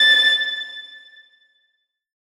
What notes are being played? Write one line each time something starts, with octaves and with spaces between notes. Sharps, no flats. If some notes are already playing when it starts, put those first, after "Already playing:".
Already playing: A6